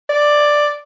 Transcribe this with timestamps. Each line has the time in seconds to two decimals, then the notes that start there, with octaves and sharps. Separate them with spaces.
0.09 D5